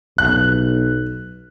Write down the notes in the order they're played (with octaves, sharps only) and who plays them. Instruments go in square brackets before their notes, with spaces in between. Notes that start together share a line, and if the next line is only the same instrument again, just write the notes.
[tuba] B1 [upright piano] F#6